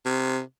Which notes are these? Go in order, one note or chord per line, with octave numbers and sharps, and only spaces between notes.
C3